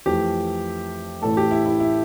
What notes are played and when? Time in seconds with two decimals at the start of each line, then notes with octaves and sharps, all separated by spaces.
0.06 F2 E3 A3 G4
1.22 A1 A2 E3 A3 A4
1.37 G4
1.51 E4
1.66 E4
1.80 E4